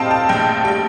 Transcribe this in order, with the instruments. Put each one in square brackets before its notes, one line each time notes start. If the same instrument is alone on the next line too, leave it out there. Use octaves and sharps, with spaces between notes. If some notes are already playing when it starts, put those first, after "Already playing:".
Already playing: [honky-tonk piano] A2 G3 C4 D#5 F5 G5 A5
A5
A#1 G5
G3 G5